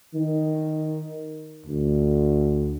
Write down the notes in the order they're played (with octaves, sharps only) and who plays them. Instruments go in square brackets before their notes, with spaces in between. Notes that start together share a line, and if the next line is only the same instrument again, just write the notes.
[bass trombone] D#3
D2